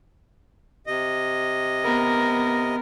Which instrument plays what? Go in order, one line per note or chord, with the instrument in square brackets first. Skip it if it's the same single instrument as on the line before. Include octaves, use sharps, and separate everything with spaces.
[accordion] C3 D#5
[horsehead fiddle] B3 A#4